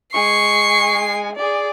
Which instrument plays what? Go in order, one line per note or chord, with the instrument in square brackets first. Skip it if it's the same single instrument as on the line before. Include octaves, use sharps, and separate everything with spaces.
[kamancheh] G#3 G#5 [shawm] C#6 [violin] C7
[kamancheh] G#4 D5